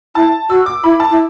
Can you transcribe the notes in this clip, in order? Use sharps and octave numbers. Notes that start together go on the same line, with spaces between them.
E4 A5
F#4 E6
D6
E4 B5
A5
E4